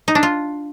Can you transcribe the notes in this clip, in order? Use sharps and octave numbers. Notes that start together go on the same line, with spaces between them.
D#4
D4
F4